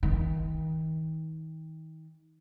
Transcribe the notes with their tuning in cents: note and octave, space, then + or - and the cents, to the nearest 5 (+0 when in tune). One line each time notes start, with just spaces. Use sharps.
D#3 +35